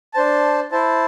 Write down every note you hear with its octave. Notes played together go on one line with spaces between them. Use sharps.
D4 C5 A5
E4 C5 A5